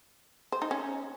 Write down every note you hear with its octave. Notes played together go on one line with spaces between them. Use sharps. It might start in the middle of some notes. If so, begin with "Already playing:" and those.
C5
D#4
C#4